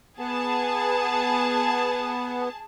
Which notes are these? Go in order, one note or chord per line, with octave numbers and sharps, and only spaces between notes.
B3 G#4 A5